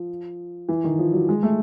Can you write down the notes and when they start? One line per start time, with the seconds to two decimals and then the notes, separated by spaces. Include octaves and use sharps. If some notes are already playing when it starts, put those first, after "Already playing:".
Already playing: F3
0.69 E3
0.84 D#3
0.99 F3
1.13 F#3
1.29 G#3
1.43 A3